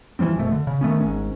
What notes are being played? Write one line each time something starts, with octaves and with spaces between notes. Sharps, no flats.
E3 F3 G3 C4
F#1 B2 A3
D3
C#3
D#3 A3 B3 C#4
G#1 G#2 C#4